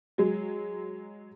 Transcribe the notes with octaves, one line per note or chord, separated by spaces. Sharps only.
F#3 G#3